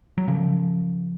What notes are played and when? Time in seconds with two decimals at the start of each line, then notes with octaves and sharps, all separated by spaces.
0.18 F#3
0.28 C#3 F3